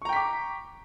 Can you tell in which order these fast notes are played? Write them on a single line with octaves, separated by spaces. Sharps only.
C#6 A#5 G5 B6 D6